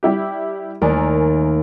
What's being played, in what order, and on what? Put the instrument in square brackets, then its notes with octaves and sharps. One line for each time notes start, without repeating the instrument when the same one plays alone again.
[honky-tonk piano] G3 E4 G4
[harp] D#2 A3 [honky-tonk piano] A#4 D5 G#5